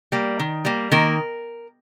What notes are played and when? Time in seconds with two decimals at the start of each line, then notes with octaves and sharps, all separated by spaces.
0.12 G3 A#3
0.39 D#3
0.65 G3 A#3
0.92 D#3 A#3 A#4